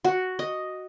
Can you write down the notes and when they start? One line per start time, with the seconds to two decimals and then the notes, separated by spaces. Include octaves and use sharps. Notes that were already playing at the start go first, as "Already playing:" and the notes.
0.05 F#4
0.39 D#5